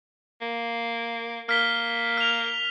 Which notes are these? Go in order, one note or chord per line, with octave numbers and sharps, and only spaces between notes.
A#3
A#3 F6 B6 G7
F6 F7